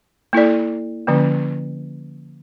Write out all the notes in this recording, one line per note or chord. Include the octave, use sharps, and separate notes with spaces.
A#3 E4 A4 D5
D3 F3 A#3 C#4